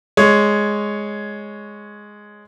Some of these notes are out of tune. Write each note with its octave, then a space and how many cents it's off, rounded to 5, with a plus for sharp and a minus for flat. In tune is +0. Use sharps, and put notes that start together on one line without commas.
G#3 +0 C#5 +0